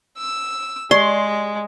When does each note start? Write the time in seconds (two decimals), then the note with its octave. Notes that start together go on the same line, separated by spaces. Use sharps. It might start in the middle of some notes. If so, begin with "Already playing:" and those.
0.18 E6
0.91 G#3 G4 D5 C6